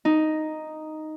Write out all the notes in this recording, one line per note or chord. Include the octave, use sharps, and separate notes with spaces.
D#4